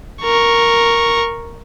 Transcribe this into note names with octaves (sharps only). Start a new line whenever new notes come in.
A#4 C#6